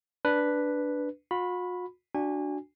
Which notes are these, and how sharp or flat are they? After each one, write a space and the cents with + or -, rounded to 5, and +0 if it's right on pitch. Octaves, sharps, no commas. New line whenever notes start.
D4 +0 B4 +0
F#4 -45 B5 +0
D4 +0 F#4 +0 G#5 -30